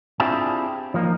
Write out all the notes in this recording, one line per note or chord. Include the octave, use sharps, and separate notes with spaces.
C4 D4 E4 F4 G4 G#4
F3 A#3 D#4